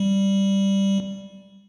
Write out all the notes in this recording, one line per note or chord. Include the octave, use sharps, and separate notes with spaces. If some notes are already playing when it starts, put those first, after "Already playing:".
Already playing: G3